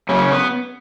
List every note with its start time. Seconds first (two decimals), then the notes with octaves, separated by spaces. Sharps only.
0.09 F#2 C#3 C#4
0.30 B3